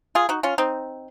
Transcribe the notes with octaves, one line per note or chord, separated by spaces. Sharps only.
F4 G#4
D#4 F#4
C#4 F4
C4 D#4